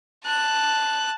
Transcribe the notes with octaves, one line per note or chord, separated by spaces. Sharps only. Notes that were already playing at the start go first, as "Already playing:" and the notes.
A5 F#6